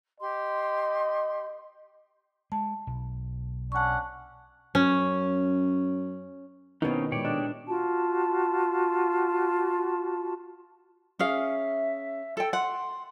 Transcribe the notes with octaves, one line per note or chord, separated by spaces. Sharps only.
G4 D#5 C6
G#3 A5
B1
C#4 D4 F#5 A5 C#6
F#2 C#4
B2 D#3 C4 C#4 D#4 E4 B4 D#5
A#2 G#3 G4 C#5 D5
D4 D#5
F4 F#4 A5
C#4 G#4 E5 F5
A4 G5 A6
F#5 C6